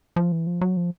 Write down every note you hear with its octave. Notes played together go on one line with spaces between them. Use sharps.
F3
E3
F3
F#3
F3